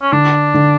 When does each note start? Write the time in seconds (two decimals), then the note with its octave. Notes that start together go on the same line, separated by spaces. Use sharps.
0.02 C#4
0.12 D3 D4
0.54 D3